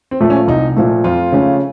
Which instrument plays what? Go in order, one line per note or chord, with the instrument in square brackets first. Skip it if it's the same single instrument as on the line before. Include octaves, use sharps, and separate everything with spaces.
[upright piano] C4
[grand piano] A#2 F3 A3
[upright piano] C#4
[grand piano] C2 [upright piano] D#4
[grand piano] A#2 F3 A3
[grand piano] F2 [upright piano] F4
[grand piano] C#3 A3 C#4